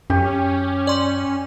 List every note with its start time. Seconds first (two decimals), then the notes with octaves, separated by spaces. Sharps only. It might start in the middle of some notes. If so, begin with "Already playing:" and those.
0.10 F#2 C#4 G4
0.87 D5 C6